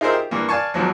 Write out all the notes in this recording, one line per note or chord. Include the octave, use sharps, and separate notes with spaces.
D#4 F4 G#4 A#4 C5 E5
G4
G2 E3 A#3
D5 F5 G#5 A5 C#6
E2 G#2 F3 F#3